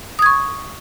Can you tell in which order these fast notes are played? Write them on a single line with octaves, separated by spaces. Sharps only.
D#6 G#6 C#6